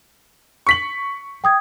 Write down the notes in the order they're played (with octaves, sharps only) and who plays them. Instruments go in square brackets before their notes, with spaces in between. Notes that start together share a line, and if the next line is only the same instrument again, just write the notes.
[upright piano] C#6 B6 F#7
[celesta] G5 D#6 G#6